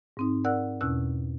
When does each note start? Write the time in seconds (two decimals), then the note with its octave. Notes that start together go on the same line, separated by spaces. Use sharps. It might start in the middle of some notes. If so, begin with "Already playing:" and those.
0.17 G#2 C4 D#4
0.45 A#4 D5 F#5 E6 F#6
0.81 E2 B2 C#4 E6 F#6